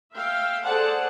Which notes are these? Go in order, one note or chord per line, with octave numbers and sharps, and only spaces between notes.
E5 F5 G5
G#4 A4 C5 D5 F#5 A5